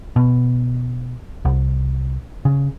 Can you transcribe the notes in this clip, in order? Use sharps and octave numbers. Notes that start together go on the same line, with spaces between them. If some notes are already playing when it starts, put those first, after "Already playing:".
B2
C2
C#3